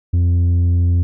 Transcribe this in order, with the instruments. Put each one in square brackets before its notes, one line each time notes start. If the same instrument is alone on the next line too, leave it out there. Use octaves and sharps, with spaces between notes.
[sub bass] F2